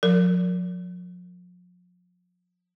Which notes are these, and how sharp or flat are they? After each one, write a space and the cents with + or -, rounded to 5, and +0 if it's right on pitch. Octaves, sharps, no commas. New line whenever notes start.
F3 +40 A#4 -25